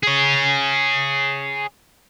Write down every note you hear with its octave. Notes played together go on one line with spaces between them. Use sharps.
G#4 C#5